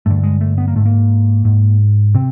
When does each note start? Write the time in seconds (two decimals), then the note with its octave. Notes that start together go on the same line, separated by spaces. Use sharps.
0.06 G2 D3 A3
0.23 G#3
0.41 A3
0.58 B3
0.68 A#3
0.76 G#2 A3
0.86 A#3
1.45 G#2
2.14 C3 C4